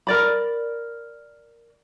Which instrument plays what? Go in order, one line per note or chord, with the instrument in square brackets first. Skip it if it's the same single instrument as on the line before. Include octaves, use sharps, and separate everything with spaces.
[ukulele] A#4 D5 B5